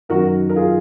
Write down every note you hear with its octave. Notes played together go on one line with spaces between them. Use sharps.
F#2 D#3 F#3 F#4 A#4
A#4
F4 G#4